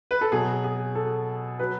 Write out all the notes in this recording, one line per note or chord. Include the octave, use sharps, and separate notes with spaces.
B4
A4
B2 F#3 G#4
G#4
A4
F#3 B4